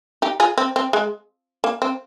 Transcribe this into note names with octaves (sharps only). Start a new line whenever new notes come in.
D#4 G4
F4 G#4
C4
C4
G#3
A#3
C4